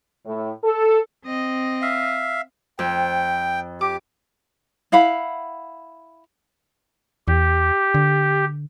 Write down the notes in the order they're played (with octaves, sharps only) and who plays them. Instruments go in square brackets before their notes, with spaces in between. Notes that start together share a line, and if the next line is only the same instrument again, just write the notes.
[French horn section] A2
A4
[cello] C4 D#5
[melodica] E5 F5
[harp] F2 [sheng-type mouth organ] G5
[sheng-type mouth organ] G4 [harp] D6
[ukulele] E4 F5 F#5 B5
[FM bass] E2 [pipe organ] G4
[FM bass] D3